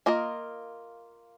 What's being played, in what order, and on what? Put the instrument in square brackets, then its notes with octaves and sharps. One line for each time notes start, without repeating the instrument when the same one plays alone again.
[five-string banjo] A#3 F4 A#4 D#5